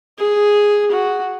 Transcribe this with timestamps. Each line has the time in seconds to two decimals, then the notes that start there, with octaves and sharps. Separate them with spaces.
0.19 G#4
0.92 F#4